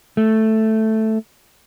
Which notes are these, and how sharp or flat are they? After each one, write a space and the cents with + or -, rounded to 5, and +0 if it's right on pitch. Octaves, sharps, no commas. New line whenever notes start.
A3 +0